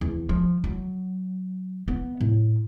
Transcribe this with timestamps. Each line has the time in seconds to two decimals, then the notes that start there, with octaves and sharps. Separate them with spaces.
0.01 E2
0.29 F3
0.64 F#3
1.88 B3
2.21 A2